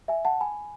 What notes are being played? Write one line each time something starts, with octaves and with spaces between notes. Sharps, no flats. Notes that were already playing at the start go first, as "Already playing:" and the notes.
E5 G#5
F#5 A5
G#5 B5